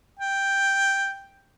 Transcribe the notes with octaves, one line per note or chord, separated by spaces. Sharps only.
G5